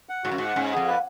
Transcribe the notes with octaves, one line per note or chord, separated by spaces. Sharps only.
F#5
G#2 F#4
F#2
G#2 F#5
G#2 C#4
F2 G#4
B4